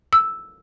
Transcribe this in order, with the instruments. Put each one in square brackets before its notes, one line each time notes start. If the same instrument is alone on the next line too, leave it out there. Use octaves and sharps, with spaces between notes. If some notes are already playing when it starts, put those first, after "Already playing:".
[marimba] E6